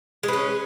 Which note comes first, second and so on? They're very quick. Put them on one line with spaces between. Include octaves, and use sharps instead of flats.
G#3 B4 C#4